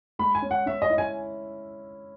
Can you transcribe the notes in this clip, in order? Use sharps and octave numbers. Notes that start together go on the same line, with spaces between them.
G#3 B5
G#5
C#4
F#5
C#4 E5
D#5
E4
G#5